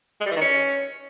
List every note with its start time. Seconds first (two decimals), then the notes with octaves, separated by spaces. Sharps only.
0.21 G#3
0.26 G3
0.31 E3
0.36 D#3
0.41 C#4